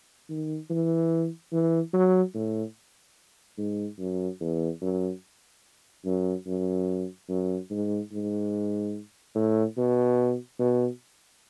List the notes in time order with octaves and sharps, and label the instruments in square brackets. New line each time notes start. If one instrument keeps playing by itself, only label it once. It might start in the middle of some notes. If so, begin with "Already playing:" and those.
[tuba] D#3
E3
E3
F#3
A2
G#2
F#2
E2
F#2
F#2
F#2
F#2
G#2
G#2
A2
B2
B2